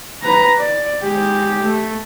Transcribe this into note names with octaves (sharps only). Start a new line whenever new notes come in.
B4 A#5
D5
G#3 G4
A3